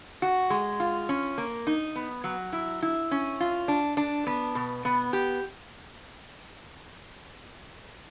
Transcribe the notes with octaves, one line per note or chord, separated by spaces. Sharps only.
F#4
G#3
F4
C#4
A#3
D#4
B3
F#3
E4
E4
C#4
F4
D4
D4
B3
B2
B3
G4